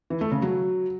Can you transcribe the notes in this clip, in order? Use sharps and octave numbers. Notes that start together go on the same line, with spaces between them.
E3
A3
C#3
F#3